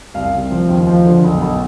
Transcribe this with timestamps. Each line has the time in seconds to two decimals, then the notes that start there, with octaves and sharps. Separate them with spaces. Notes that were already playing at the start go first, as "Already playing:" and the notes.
0.14 C2 F5
0.33 C3
0.51 F3
0.69 D#2
0.87 F3
1.06 D3
1.24 B1
1.42 B1